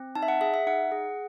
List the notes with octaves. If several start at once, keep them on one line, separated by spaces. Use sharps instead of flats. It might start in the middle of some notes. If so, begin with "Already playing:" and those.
Already playing: C4
D#4 A5
E5
F#5
G#4 E5
E5
D#4 F#5
G#4